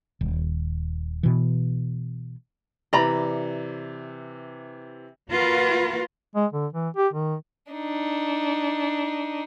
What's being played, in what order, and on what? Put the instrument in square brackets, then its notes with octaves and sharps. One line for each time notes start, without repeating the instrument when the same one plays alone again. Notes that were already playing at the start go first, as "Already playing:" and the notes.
[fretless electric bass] D#1
B2 E3
[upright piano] C3 E3 [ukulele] D5 A#5 B5
[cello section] A#3 F4 F#4 A#4 B4
[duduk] G#3
D3
E3
G4
D#3
[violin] D4 D#4